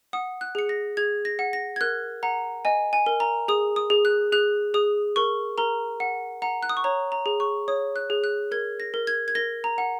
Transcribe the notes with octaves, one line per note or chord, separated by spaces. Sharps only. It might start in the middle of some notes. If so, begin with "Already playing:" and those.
F#5 D#6
F#6
G#4 C#7
A#6
G#4 G#6
A#6
F#5
A#6
G#6
A#4 F#6
F#5 A#5
D#5 G#5
G#5
A#4
A#5
G#4 D#6
D#6
G#4
F#6
G#4 F#6
G#4 D#6
A#4 C#6
A#4 A#5
F#5
F#5 A#5
F#6
D#6
C#6
C#5 A#5
A#5
G#4
C#6
C#5 D#6
F#6
G#4
F#6
A#4 G#6
A#6
A#4
G#6
G#6
A#4 A#6
A#5
F#5